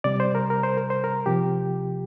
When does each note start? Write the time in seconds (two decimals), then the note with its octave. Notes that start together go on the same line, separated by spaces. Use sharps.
0.04 C3 G3 D5
0.20 C5
0.35 A#4
0.50 A#4
0.63 C5
0.77 A#4
0.90 C5
1.04 A#4
1.26 C3 F3 G4